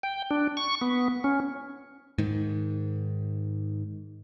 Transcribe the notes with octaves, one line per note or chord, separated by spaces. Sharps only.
G5
D4
C#6
B3
C#4
G#2 D#3